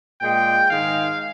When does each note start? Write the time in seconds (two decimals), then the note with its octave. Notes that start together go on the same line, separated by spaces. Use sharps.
0.20 A#2 G#3 G5
0.68 G#2 D#3 G#3 F5